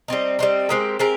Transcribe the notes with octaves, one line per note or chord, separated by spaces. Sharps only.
G3 C4 D#4
G3 C4 D#4
G#3 C4 G4 A#4
G#3 C4 G4 A#4